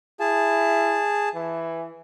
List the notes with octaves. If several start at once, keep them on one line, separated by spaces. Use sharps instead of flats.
E4 G#4 A5
E3